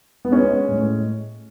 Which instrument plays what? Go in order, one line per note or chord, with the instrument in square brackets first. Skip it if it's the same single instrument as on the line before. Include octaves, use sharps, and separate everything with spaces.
[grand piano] B3
G#3 C#4
A2